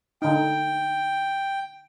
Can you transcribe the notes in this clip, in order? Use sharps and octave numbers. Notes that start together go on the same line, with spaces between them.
D3 D#4 G5